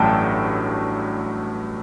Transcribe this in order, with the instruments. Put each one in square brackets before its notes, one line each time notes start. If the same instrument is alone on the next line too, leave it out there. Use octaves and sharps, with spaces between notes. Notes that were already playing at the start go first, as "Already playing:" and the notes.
Already playing: [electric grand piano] A1 G2 F#3 A3 G5 A5